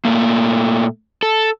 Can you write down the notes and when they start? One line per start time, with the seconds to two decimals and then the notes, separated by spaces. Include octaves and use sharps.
0.05 A#2 D#3 A3 A#3
1.23 A4